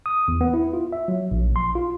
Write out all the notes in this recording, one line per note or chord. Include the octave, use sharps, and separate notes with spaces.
D#6
E2
B3
E4
F4
E5
F#3
A#1
C6
F4